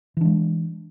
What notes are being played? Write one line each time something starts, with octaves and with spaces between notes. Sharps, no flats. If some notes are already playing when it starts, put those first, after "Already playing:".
E3 G#3 D4